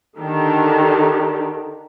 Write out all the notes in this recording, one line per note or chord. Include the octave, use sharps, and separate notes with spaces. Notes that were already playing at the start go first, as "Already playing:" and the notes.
D3 D#3 D4 G4